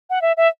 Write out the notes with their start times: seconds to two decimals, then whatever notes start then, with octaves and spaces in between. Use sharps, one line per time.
0.10 F#5
0.22 E5
0.37 E5